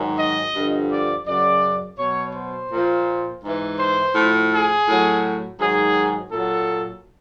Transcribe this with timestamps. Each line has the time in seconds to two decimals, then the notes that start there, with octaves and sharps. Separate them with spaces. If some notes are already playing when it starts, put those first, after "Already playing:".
Already playing: G#2 D#3 F#3
0.19 D#5
0.55 G2 D3 F3
0.91 D5
1.27 F#2 C#3 F#3 D5
1.99 B2 F#3 C#5
2.36 C5
2.71 A#2 F3
3.43 G#2 E3
3.79 C5
4.15 A2 F3
4.52 G#4
4.88 A2 F#3
5.59 G#2 D#3 F#3 G#4
6.31 A#2 F#3 A4